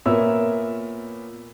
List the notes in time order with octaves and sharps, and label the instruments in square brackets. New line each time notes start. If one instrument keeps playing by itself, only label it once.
[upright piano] A#2 B3 A#4 C#5 E5 E6